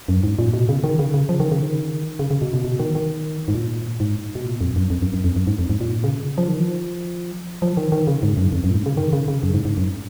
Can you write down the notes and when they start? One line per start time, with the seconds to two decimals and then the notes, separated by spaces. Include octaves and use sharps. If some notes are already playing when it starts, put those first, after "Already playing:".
0.09 F#2
0.24 G#2
0.39 A#2
0.53 B2
0.69 C#3
0.84 D#3
0.99 C#3
1.14 C#3
1.29 F3
1.40 D#3
1.52 C#3
1.62 D#3
2.19 C#3
2.31 C#3
2.42 B2
2.54 B2
2.64 B2
2.79 D#3
2.95 D#3
3.48 G#2
3.55 A#2
4.00 G#2
4.35 B2
4.45 A#2
4.61 F2
4.76 F#2
4.90 F2
5.02 F#2
5.14 F#2
5.24 F2
5.36 F#2
5.47 G#2
5.59 F2
5.70 G#2
5.81 A#2
6.04 C#3
6.38 F3
6.48 D#3
6.60 F3
7.62 F3
7.77 D#3
7.92 D#3
8.07 C#3
8.23 G#2
8.37 F#2
8.53 F2
8.64 F#2
8.71 A#2
8.75 G#2
8.86 C#3
8.97 D#3
9.13 C#3
9.28 C#3
9.43 F#2
9.54 G#2
9.65 G#2
9.77 F#2